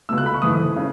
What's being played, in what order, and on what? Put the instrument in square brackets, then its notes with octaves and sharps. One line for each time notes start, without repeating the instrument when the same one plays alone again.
[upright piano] C#2 B2 A3 E6
F#6
B5
C#6
G#2 E3 A3 D#6
C#3